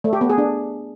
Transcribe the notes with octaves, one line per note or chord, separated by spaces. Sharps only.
A3
G4
B3
G#4
D4